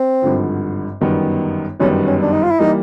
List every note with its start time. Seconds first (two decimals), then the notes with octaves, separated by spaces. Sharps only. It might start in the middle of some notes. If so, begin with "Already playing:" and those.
Already playing: C4
0.22 G#1 G2 D3 F3
1.01 G1 F#2 D#3 G3 B3
1.80 G1 F#2 D#3 G3 B3 C#4
2.07 C#4
2.22 D4
2.33 D#4
2.43 F4
2.51 E4
2.59 E3 G3 A#3 D#4